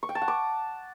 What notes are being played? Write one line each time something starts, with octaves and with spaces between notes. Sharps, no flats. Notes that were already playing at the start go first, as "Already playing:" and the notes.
C#6
G5
A5
F#5
D6